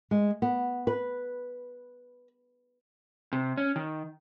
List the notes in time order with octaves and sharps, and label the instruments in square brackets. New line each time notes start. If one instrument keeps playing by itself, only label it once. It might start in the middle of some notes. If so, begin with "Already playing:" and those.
[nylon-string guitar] G#3
B3
B4
[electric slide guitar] C3
C#4
D#3